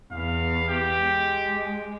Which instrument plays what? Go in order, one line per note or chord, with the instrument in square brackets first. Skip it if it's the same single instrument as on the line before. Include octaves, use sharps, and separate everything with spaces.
[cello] E2 B3 [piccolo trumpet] F5
[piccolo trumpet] G4
[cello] G#3